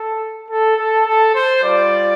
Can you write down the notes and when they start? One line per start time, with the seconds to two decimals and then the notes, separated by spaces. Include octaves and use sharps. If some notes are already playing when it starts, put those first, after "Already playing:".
Already playing: A4
0.49 A4
0.77 A4
1.06 A4
1.35 C5
1.63 G3 F4 D5